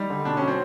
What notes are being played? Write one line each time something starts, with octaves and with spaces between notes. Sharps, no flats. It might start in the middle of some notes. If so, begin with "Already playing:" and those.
Already playing: G3 D#4
D3
B2 D4
F#3 C#4
C4